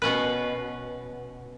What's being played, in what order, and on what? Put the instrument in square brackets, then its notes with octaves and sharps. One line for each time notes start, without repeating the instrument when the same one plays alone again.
[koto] B2 C#4 B4